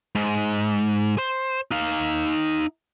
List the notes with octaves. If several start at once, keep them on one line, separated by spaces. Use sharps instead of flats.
G#2
C5
D#4 F5